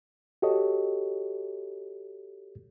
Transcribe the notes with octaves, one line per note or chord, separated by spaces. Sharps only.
F#4 G4 A4 C#5 D#5